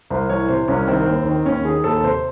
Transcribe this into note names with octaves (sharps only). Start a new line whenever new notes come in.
C2 C5
E3 C#5
C3 C5
C2 C#4
D#3 C4
D#2
D#3
D#2 C#4
D#3 G#4
D#2 A4
C3 C5